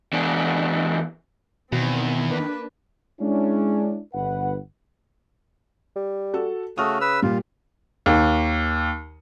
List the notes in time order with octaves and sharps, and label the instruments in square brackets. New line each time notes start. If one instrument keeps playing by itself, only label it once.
[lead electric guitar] E2 D4
[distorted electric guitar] E2 [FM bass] B2 [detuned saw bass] D#3 [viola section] C4
[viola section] A#3 D4 B4
[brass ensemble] G#3 C#4 D4 E4
G1 B4 F#5
[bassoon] G3
[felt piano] F#4 A4
[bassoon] C#3 [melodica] A3 F#4 [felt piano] D#6 F6
[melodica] B4 E6
[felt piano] A#2 G3 [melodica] F4
[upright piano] D#2